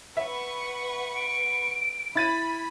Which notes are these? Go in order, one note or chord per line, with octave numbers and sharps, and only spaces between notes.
B4 E5 F#5 C#6
D7
E4 B5 A6 D#7